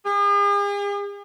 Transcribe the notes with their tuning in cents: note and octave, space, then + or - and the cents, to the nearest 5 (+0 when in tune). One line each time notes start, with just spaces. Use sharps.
G#4 -45